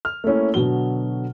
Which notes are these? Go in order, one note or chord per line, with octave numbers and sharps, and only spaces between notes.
F6
A3 A#3 C#4 E4
B2 D3 F#3 G7